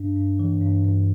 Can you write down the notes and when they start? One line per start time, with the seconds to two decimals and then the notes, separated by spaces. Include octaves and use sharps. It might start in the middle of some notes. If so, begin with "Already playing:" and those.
Already playing: G2 D4
0.16 G2
0.39 E3
0.61 G2
0.84 G2